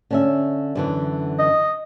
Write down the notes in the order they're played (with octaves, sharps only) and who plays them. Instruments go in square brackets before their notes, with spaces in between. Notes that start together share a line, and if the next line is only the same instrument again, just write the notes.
[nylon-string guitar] D3 C#4 E5
F#2 D3 E3
[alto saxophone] D#5